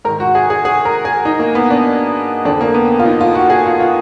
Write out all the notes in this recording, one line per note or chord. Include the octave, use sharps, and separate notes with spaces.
G#2 D#3 A#4
F#4
G#4
G#4
G#4
A#4
G#4
D#4
A#3
B3
D4
F2 D3 D4
A#3
B3
F4
D#4
F4
F#4
G#4
F4
F4